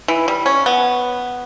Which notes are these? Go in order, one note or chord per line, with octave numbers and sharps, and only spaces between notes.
E3
G3
C#4
B3